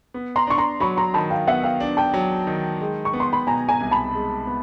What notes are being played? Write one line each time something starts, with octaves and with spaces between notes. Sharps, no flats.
B3
A#5 C6
D4 C#6
A#5 C6
F#3 B5 C#6
A#5 C6
D#3 A5 B5
F5 G5
B3 E5 F#5
F5 G5
D4
G5 A5
F#3
D#3
G#3
C#6
B3
C6
B5
B2 G#5 A#5
G#5 A#5
C2
A5 B5
G#3
B3